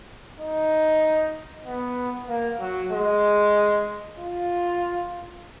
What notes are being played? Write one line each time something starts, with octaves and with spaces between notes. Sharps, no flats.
D#4
B3
A#3
F#3
G#3
F4